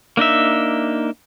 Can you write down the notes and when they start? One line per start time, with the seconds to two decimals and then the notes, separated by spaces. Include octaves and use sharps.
0.17 A#3 D4 D#4 E5